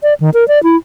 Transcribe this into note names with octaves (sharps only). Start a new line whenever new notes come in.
D5
D#3
A#4
D5
E4